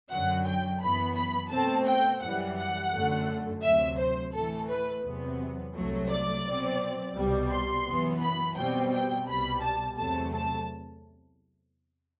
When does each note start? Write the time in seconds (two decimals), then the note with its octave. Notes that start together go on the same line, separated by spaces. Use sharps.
0.11 F#2 D3 F#3 F#5
0.46 G5
0.82 F#2 E3 B3 B5
1.16 B5
1.51 B2 A3 C4 A5
1.87 G5
2.22 F#2 E3 G3 F#5
2.57 F#5
2.93 F#2 D3 A3
3.63 D2 C3 F#3 E5
3.99 C5
4.34 A2 E3 A3 A4
4.69 B4
5.04 E2 C3 F#3 B3
5.75 C2 C3 F#3 A3
6.10 D5
6.46 B2 F#3 C4
7.16 C2 B2 G3
7.51 C6
7.87 F#2 E3 B3
8.22 B5
8.57 B2 G3 C4 G5
8.92 G5
9.28 C2 B2 G3 B5
9.62 A5
9.98 E2 C3 F#3 A3 A5
10.34 A5